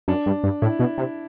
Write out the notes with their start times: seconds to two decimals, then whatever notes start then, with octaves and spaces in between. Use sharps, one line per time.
0.08 F#2 D4
0.26 G2
0.44 G2
0.62 A2 E4
0.79 B2
0.98 C3